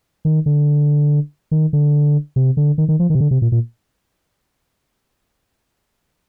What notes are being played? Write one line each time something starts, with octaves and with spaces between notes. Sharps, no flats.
D#3
D3
D#3
D3
C3
D3
D#3
D#3
F3
D#3
C3
D3
C3
A#2
A#2